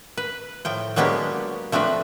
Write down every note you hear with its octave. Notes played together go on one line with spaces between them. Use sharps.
B4
A2 F3 G5
F#3 G#3 A#3 B3 D4 G4
F3 A3 C4 D4 B4